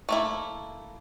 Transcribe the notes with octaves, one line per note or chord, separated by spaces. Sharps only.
A3 A#3 E4